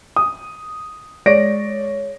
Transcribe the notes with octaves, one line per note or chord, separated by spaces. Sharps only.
D#6
G#3 C#5 D5 A#6 D7